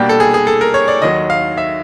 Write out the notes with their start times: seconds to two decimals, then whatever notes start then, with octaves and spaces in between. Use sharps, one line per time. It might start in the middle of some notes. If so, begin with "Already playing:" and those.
Already playing: B2 G3 A#3 D4 G4
0.09 A4
0.20 G#4
0.34 G#4
0.47 A4
0.61 A#4
0.74 C#5
0.88 D5
1.02 D#2 D#3 F#3 D#5
1.30 F5
1.58 E5